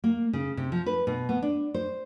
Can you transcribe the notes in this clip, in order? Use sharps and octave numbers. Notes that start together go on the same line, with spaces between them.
A#3
C#3
C3
F3
B4
B2
B3
D4
C5